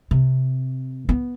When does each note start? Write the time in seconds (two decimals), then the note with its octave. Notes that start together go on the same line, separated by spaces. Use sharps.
0.11 C3
1.09 B3